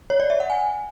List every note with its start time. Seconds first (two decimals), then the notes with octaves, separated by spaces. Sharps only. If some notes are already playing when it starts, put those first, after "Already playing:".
0.10 C#5
0.20 D5
0.30 E5
0.40 F#5
0.50 G#5